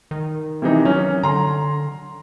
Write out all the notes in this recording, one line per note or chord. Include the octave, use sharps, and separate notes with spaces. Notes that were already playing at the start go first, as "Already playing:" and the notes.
D#3
C3 E3 D#4
F#3 C#4
D3 A#5 C6